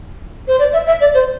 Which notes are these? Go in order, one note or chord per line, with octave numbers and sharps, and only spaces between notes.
C5
D5
E5
E5
D5
C5